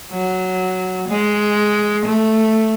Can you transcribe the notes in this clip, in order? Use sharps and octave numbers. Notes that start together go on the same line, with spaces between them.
F#3
G#3
A3